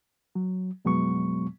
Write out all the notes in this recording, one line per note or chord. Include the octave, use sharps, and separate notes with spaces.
F#3
F2 B2 F#3 G#3 B3 C#6